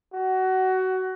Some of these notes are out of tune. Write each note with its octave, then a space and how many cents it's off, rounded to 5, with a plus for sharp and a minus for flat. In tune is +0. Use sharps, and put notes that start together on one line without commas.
F#4 +20